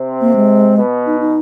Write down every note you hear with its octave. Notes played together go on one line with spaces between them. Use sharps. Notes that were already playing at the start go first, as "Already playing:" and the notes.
Already playing: C3 C4
A#3
G#3
B2 B3
D#4
D#4